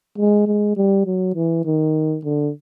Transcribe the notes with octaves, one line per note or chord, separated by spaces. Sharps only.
G#3
G#3
G3
F#3
E3
D#3
D3